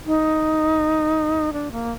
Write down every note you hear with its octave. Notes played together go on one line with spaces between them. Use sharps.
D#4
D4
A#3